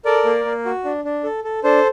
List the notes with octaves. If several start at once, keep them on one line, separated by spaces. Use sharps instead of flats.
A4 A#4 D5
A#3
A#3
F#4
D4
D4
A4
A4
D4 A4 C5